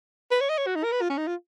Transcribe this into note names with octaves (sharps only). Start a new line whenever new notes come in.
B4
C#5
D#5
C#5
F#4
D#4
A#4
B4
F4
C#4
D#4
F4